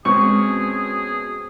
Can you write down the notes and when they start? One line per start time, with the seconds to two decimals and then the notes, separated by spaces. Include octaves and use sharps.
0.05 B2 G#3 C4 C#4 G#4 C#6